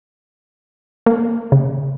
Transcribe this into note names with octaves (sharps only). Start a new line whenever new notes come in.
A#3
C#3